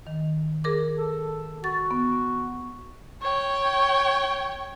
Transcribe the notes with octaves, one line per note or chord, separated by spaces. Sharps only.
D#3
G#4 A#4 D6
A4
F#4 A6
B3
C#5 G5